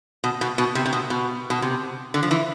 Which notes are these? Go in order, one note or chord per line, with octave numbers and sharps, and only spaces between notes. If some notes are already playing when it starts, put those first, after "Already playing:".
B2
B2
B2
C3
C3
B2
B2
B2
C3
D3
F3
E3